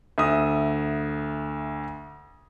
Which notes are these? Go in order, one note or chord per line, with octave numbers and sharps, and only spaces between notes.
D2 E5 D#6